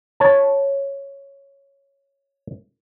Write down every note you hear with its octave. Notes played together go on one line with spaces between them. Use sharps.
C#5 A5